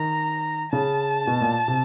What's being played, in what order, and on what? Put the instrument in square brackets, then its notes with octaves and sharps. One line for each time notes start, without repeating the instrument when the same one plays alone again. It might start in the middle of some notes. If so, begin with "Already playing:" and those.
Already playing: [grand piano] D#3 [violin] A#5
[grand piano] C#3 [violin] A5
[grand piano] B2
A#2
C3